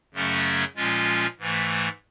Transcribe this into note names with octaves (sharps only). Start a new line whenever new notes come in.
F#2 C#3 F#3 A3 C#4
A#2 F3 G#3 C#4 F4
G#2 E3 A3